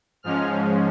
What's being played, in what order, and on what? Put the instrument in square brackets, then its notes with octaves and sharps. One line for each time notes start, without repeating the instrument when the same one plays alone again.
[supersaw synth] G#2 F3 G#3 C#4 F6